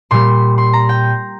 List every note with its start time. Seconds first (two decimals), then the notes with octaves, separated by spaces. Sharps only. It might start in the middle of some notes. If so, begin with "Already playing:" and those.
0.11 A#2 G3 C6
0.58 C6
0.73 A#5
0.89 G5